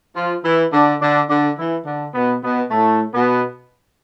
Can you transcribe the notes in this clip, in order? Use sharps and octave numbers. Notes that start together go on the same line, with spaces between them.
F3 F4
E3 E4
D3 D4
D3 D4
D3 D4
E3 E4
D3 D4
B2 B3
B2 B3
A2 A3
B2 B3